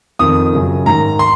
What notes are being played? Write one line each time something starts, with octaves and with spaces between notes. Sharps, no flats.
F2 D#3 D#6
F#2 C#3
G#2 D#3 A#5
C6